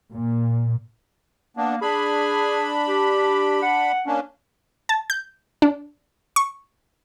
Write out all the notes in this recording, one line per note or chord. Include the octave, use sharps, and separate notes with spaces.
A#2
A#3 B3 D4
D4 G#4 B5
G4
F#5
A#3 C#4 D4
A5
G6
D4
C#6